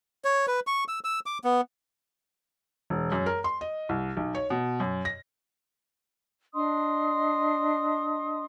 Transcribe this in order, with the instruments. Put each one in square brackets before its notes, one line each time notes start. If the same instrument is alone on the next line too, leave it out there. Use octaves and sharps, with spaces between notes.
[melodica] C#5
B4
C#6
E6
E6
D6
B3
[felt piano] E1
F#2
A#4
C6
D#5
C2
B1
C#5
B2
F#2
A#6
[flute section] D4 D#5 C6 D#6